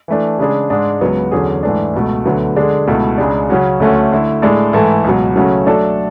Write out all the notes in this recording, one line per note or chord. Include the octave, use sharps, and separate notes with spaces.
E3 A3 D4
C#3 G#3 D4 G#4
G#2 G#3 D4 G#4
C#2 C#3 F#3 B3
E2 D3 F#3 C#4 G#4
G#2 E3 A3 D4
C#2 B2 A3
D2 D3 F#3 B3
D3 G#3 D4 G#4
C#2 B2 A3 E4
C#2 C#3 G#3 D4
C#3 F#3 C#4 F#4
D2 D3 A3 C#4 F#4
D3 A3 E4
A2 G#3 D4 A4 D5
G#2 E3 A3 E4 A4
C#2 B2 F#3
C#3 F#3 A3 C#4 F#4
F#3 A3 D4 A4